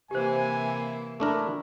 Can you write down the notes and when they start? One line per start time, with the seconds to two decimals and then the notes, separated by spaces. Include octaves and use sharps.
0.11 C3 E3 A#3 G4 C5 G#5
1.20 A3 D4 E4 A#4